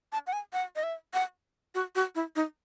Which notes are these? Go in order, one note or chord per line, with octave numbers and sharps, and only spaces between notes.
A5
F#5
G#5
F#5
D#5
E5
F#5
F#4
F#4
E4
D#4